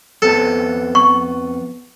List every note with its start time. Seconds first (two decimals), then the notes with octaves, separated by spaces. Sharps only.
0.22 F2 B3 A4 A5
0.95 C#6